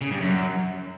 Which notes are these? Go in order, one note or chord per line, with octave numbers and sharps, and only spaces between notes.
C#3
G2
F#2